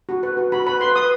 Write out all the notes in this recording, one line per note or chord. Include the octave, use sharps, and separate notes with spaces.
F#4
B4
F#4
F#4 B5
B4 B5
B4 C6
B4 D#6